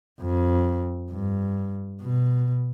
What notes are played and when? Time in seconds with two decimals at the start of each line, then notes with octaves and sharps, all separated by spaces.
0.22 F2
1.11 G2
2.02 B2